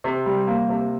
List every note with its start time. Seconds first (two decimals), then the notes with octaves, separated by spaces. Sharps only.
0.04 C3
0.26 G3
0.47 A#3
0.69 C3